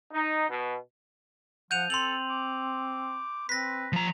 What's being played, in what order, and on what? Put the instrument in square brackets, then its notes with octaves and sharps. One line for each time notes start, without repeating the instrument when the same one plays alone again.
[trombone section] D#4
B2
[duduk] F3 [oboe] F#5 [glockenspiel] G6 D#7 F7
[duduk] C4 [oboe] A4 [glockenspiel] C6 F7 F#7
[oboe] D6
[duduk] C4 [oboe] B4 [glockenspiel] A#6 B6
[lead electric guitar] F3 A#5